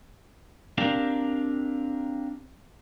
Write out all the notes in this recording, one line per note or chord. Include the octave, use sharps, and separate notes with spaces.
C4 D4 G4 A#4 F5